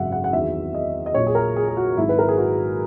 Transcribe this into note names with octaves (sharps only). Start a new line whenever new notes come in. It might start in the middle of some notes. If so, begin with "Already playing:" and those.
Already playing: G#1 F#2 C#3 F#3 E5 F#5
F#5
F#5
E2 D#3 F#3 E5
D#5
D#5
A#1 A#2 F#3 C#5
G#4
A#4
G#4
G#4
F#4
G#1 G#2 D#3 F#3 E4
B4
A#4
G#4
F#4